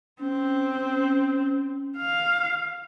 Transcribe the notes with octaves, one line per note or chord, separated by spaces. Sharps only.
C4 C#4
F5